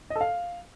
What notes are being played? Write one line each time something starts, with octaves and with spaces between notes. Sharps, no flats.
D#5
A4
F5